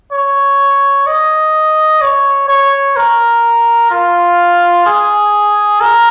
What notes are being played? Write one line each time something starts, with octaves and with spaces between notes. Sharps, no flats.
C#5
D#5
C#5
C#5
A#4
F4
G#4
A#4